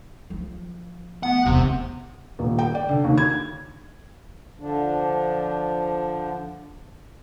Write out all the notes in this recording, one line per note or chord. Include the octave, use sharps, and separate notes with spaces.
F3
A3 B3 F#5
E1 C3 D#3
D#1
G5
D5
D3
D#2
G#6
D3 F3 D4